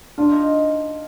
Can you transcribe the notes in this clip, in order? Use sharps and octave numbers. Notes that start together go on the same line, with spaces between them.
D4 F4
D#4